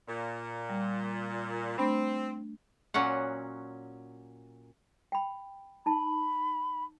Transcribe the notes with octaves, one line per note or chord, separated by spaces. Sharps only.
A#2
G3
A3 C4 D4 B5
A#2 F#3 C#4 F#5
G5 B5
D#4 A5 B5